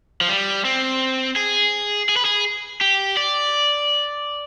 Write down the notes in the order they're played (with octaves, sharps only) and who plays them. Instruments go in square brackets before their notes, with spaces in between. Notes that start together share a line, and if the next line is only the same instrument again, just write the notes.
[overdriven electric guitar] F3
G3
C4
G#4
G#4
B4
G#4
G4
D5